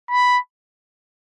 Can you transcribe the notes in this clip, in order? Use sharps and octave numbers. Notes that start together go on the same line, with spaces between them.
B5